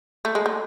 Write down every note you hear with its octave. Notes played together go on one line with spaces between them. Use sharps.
A3
G#3
A3